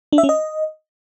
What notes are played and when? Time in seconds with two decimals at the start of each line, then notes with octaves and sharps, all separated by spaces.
0.13 D4
0.18 E5
0.23 C#4
0.29 D#5